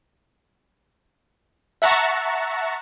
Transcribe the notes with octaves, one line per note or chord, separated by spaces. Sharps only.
E5 F#5 A5 A#5 C#6